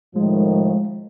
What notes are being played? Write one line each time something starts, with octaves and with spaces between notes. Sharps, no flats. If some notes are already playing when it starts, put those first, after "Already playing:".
A2 D#3 F3 G#3